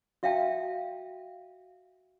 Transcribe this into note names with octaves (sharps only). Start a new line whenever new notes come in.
F#4 E5 F5 G5 A5